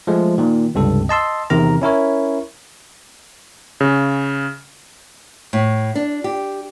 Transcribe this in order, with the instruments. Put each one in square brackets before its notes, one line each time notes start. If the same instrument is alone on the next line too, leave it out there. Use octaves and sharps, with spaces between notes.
[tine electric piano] F3 G#3 A3
A#2 D#3
C#2 G2 C3 A4
D#5 A5 C6 E6
E2 C3 D#3 A#4 A#5
C#4 E4 A#4 C#5
[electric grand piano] C#3
[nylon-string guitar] A2
D4
G4